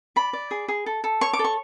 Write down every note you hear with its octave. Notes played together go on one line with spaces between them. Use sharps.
D5 B5
D5
G#4
G#4
A4
A4
C#5 C#6
D6
A4
C#6